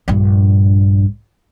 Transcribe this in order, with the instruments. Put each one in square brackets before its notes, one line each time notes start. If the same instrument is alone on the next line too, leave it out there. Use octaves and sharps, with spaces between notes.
[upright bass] A#1 G2